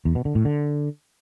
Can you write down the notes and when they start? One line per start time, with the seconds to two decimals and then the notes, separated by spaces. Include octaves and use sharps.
0.05 E2
0.15 B2
0.25 D3
0.35 A2
0.45 D3